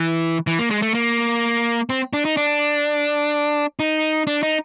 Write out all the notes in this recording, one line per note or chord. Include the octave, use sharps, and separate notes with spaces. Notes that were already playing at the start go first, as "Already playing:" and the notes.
Already playing: E3
E3
A#3
G#3
A3
A#3
C4
D4
D#4
D4
D#4
D4
D#4